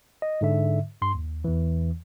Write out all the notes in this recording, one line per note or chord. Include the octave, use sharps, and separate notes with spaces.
D#5
G#2 D3 E5
G2 C6
D#2
E2 E3